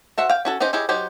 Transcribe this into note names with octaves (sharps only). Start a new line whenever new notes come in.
F#4 C5 E5 F#5
F5 G5
C#4 F#4 A4
C4 C#4 D#4 G4 C5
D#4 E4 G4 G#4 C#5
F#3 D#4 G4 C5